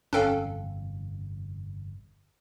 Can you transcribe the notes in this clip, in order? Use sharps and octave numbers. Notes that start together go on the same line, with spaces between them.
G1 F2 C3 C#4 A4 F5 G5 F#6